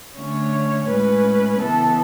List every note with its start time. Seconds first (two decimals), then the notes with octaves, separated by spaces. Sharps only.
0.17 D3 A3 C#4 C#5
0.89 A2 G#3 C#4 B4
1.61 C#3 E3 B3 A4